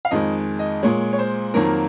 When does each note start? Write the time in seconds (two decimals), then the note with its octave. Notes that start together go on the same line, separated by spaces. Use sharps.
0.05 F5
0.11 F2 D#3 G#3 D#5
0.59 D#5
0.83 A#2 G#3 C#5
1.13 C#5
1.19 C5
1.54 F2 D#3 F#3 A#3 A#4